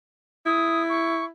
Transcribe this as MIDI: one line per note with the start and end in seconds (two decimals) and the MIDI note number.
0.46 1.28 64
0.46 0.83 87
0.89 1.25 85